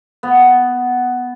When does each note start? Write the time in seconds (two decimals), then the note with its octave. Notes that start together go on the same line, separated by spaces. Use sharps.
0.23 B3